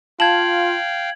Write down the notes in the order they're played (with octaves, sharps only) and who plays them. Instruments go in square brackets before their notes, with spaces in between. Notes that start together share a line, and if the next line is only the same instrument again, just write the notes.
[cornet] F4 [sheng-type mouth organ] F5 G5 [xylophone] A5 [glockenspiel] G#6 F#7